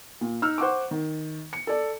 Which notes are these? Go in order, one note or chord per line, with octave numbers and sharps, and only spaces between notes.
A#2
D#4 E6 F6
C5 F#5 C#6 D6
D#3
C#7
A4 D5